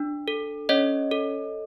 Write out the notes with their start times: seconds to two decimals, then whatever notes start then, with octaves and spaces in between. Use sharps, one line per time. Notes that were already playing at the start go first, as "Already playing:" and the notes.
Already playing: D4
0.28 A4
0.69 C#4 C#5 D#5
1.11 A4